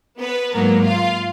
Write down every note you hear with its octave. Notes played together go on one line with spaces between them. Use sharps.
B3 B4
G#2 F#3 A#3 B3 A#4
F4 F5